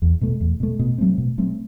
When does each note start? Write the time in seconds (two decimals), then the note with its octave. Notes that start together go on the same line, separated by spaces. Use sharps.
0.02 E2
0.21 B2 A3
0.40 E2
0.60 B2 A3
0.79 B2
0.98 F#3 A3 C4
1.18 B2
1.38 F#3 A3 C4